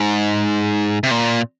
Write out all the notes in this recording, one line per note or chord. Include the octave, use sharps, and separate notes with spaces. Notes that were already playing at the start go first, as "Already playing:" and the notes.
Already playing: G#2
C3
A#2